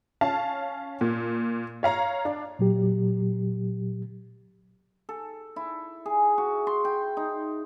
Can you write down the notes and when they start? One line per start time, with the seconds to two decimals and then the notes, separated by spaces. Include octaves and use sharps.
0.21 C#4 F5 A5
1.01 A#2
1.83 C#5 F5 A#5
2.25 D4
2.59 A#2 F#3 G4
5.09 A4
5.56 E4
6.06 G#4
6.38 F#4
6.67 C6
6.85 G5
7.17 D#4